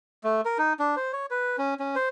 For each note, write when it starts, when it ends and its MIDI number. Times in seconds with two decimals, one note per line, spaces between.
0.24 0.41 57
0.45 0.58 70
0.58 0.73 63
0.79 0.95 62
0.97 1.12 72
1.13 1.26 73
1.31 1.56 71
1.58 1.74 61
1.80 1.95 61
1.96 2.09 72